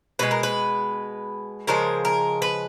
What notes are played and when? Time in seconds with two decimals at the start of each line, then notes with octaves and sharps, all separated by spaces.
0.19 B2 G#3 B4
0.31 A#4
0.43 B4
1.67 C#3 F3 G#3 A#4
2.05 A#4
2.42 B4